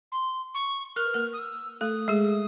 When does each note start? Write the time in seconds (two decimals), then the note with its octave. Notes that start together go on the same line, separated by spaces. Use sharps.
0.12 C6
0.54 C#6
0.96 A#4 F6
1.05 B4
1.14 A#3 A#4
1.33 D#6
1.38 E6
1.81 A3 A4 D#6
2.08 G#3 G#4